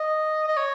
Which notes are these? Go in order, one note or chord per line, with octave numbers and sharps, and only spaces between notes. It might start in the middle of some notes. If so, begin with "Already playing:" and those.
Already playing: D#5
D#5
C#5